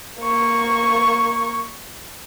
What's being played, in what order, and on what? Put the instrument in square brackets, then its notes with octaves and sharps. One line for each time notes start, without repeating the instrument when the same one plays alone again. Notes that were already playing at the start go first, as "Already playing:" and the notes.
[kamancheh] A#3 C#6